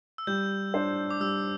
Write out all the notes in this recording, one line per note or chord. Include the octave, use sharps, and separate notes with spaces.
E6
G3 G6
D4 C5
D6
G3 E6